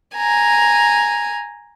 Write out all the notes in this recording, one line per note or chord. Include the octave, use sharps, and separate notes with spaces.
G#5 A#5